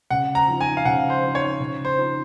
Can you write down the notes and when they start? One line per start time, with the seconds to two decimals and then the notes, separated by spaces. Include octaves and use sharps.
0.10 C#3 F#5
0.35 A#5
0.48 F3 C4 D#4
0.61 G#5
0.77 F5
0.85 C#3 F#5
1.10 C5
1.22 F3 C4 D#4
1.35 C#5
1.60 C#3
1.85 C5
1.97 F3 C4 D#4